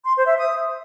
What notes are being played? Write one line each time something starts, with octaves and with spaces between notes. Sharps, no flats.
C6
C5
E5
D#6